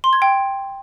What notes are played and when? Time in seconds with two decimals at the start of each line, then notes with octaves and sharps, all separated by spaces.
0.04 C6
0.13 G#6
0.22 G5